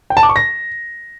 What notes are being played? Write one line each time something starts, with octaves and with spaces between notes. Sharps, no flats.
G5
A5
D6
C#6
A#6